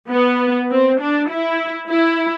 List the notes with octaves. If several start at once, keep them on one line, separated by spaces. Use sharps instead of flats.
B3
C4
D4
E4
E4